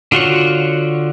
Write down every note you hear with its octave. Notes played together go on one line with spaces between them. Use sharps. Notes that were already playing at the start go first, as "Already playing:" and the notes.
D3 F4 F#4 C#5